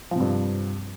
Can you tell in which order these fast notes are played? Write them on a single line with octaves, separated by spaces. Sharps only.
F3 C3 G2